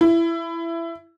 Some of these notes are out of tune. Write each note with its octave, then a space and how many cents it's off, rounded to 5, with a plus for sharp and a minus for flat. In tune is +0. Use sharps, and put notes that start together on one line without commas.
E4 +20